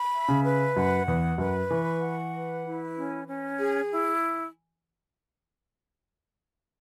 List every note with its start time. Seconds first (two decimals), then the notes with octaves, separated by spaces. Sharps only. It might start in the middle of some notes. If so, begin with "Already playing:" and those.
Already playing: B5
0.13 E5
0.28 C#3
0.44 B4
0.76 F#2 F#5
1.07 E2 B4
1.38 F#2 B4
1.70 E3 C#6
2.01 F#5
2.33 B4
2.64 E4
2.96 C#4
3.27 C#4
3.59 G#4
3.90 E4